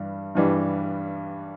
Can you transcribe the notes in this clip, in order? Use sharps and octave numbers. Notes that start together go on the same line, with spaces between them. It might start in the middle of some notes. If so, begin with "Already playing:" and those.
Already playing: G2 E3 G3 D4
G2 E3 G3 D4